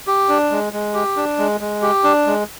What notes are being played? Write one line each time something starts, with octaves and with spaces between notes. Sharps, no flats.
G4
D4
G#3
G#3
G4
D4
G#3
G#3
G4
D4
G#3